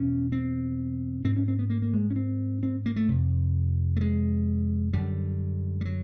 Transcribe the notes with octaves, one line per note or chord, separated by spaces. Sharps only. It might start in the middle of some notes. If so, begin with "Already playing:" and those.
Already playing: E2 B2 C#4
C4
G#2 C4
C#4
C4
B3
A#3
A#3
G#3
C#4
C4
C4
A#3
A3
F2 C3
A3
G#3
F#2 D3 G3
G3
F#3